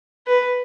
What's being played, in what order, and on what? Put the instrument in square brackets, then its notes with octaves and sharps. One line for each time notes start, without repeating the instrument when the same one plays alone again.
[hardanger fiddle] B4